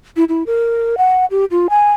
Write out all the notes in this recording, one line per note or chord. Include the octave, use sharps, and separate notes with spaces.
E4
E4
A#4
F#5
G4
F4
G#5